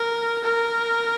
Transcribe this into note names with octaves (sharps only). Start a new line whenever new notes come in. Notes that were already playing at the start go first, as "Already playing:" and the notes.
Already playing: A#4
A#4